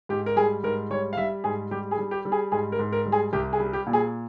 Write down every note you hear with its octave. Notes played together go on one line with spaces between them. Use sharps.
G#2 G4
A#4
G3 G#4
G#2 A#4
G3 C#5
F5
G3 E5
G#2 G#4
G3 G4
G#4
G3
G4
G3
G#4
G#2 G#4
A#4
G#2
A#4
G3
G#4
C2 G4
G#4
G3
G4
A#2
G#4